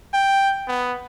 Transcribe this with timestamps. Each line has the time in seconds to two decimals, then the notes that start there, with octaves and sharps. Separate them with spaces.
0.13 G5
0.68 B3